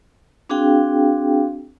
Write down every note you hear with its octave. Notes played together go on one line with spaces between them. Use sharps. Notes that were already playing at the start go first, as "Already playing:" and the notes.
C4 D4 F#4 G#4 F5 G5